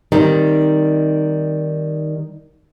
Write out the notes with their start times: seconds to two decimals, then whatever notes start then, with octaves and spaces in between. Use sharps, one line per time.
0.12 D#3 G3 C4 D#4